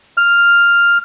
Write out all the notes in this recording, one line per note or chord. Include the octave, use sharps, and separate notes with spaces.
F6